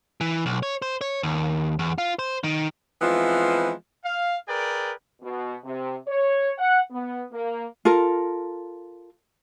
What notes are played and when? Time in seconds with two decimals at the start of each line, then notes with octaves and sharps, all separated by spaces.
0.21 E3
0.46 B1
0.63 C#5
0.82 C5
1.01 C#5
1.23 D#2
1.79 E2
1.98 F4
2.19 C5
2.44 D#3
3.02 E3 F3 G#3 B3 C4 F4
4.05 F5
4.49 G#4 A#4 B4 D5 G5
5.22 B2
5.64 C3
6.07 C#5
6.58 F#5
6.91 B3
7.31 A#3
7.85 F4 A4 A#4